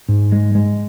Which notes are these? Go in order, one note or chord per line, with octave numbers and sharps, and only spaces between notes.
G#2
G#3
G#3